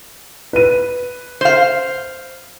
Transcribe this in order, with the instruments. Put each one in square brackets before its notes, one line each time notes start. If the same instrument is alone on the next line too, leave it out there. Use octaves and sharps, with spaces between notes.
[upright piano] B4 D#7
[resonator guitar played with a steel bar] C5 F5